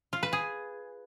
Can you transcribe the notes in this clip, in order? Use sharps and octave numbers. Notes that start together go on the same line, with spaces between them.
F4
B4
G#4